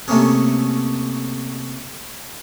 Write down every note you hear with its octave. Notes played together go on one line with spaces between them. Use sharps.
C3 A3 A#3 C#4 G#4